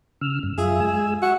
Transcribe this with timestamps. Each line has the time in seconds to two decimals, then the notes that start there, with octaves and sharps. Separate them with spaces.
0.21 C#3 E6 F6
0.43 G2
0.58 F#2 F4 G#4 E5
0.80 G#3 G#5 E6
1.22 F#4 E5